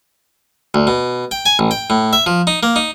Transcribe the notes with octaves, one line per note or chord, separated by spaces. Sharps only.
D2
B2
G5
G#5
A1
G5
A2
E5
F3
D#4
A#3
D#4